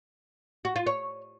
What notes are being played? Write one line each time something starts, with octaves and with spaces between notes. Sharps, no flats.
F#4
F4
C#5